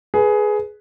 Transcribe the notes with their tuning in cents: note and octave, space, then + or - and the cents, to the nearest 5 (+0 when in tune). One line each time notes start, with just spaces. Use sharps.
G#4 +15 B4 +0